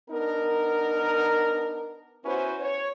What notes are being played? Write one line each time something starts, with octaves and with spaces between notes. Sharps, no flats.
B3 D4 D#4 A#4
B3 C#4 E4 F#4 B4 C5
C#5